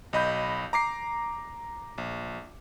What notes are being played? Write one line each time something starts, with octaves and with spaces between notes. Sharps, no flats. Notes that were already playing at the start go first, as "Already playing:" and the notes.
B1 D#5 B5 G6
A#5 D6 C7
A#1